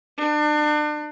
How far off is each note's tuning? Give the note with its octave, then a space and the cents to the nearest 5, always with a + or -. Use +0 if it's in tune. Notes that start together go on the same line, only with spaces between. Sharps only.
D4 +35